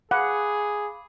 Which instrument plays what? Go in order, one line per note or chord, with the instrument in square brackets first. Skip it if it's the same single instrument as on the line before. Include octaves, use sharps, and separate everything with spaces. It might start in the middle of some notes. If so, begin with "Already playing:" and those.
[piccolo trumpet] G#4 [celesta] F5 B5 D6 [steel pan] F#5